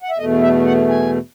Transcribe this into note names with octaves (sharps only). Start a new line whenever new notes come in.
F#5
E5
E2 B2 A3 D#5
E5
F#5
G#5